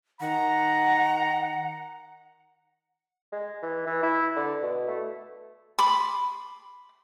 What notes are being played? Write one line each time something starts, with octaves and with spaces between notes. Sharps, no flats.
D#3 F#5 A#5
G#3
E3
E3
E4
D3
B2
A3
B5 C6 D6